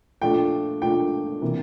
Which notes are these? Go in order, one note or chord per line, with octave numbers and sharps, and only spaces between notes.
A#2 F3 A3 D4 G5
A#2 F3 A3 D4 G5
C3 E3 A#3